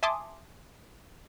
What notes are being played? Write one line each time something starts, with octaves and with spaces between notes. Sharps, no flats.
E5 G#5 A5 C6 D6 D#6